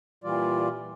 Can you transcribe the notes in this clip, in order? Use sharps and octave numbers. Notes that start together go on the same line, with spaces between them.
A#2 E3 G3 F4 D5